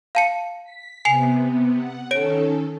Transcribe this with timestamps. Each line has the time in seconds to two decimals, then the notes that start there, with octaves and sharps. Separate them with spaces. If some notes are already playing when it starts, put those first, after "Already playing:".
0.15 F5 A5 C#7
0.64 B6
1.05 C3 B3 G#5 C7 F7
1.78 F#5
2.11 D#3 C#4 A4 C#5 D7